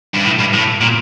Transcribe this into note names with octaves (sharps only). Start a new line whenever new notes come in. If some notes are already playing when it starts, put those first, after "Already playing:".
G2
A2
G2
A2
A#2